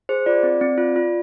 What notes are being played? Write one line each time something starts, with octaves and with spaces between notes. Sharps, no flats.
G#4 C5
F4 D5
C4
C4
F4
F4